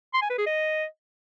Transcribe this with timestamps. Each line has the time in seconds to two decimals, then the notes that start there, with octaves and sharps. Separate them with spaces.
0.14 C6
0.22 G#5
0.30 B4
0.38 G#4
0.46 D#5